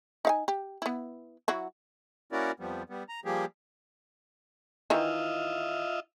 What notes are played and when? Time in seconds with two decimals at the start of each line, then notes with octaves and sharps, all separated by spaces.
0.25 D#4 F5 G#5
0.48 G4
0.82 B3 E4
1.48 F#3 E4 F#4
2.32 A#3 C#4 E4 F#4 A#4 D5
2.60 F2 F3 G3 B3
2.89 G3 B3
3.09 A#5
3.25 F3 G3 A#3 G4 G#4
4.90 D#3 E3 F4 D#5 E5